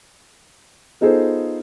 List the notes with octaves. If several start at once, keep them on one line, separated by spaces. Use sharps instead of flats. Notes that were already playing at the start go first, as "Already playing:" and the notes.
B3 D#4 F4 G#4 A4 C5